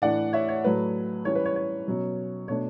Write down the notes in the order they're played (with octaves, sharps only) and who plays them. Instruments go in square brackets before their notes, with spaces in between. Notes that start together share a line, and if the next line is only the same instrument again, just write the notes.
[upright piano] A2 E3 A3 D4 D5 F#5
C#5 E5
C#5
A2 F#3 A3 B4
E3 G3 C#4 C#5
B4
C#5
C#5
B2 F#3 C#4
B2 A3 D4 C#5